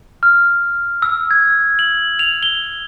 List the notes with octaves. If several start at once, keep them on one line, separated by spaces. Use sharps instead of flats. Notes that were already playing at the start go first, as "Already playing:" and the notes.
F6
E6
G#6
F#7
F7
G7